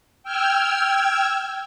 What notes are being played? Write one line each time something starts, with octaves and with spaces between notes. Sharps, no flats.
G5 E6 F6 G#6